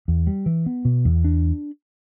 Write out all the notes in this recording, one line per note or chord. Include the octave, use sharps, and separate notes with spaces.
E2
G3
E3
B3
B2
E2
D4